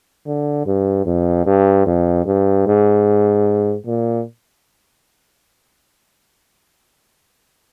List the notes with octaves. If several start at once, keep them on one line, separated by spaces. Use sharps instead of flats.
D3
G2
F2
G2
F2
G2
G#2
A#2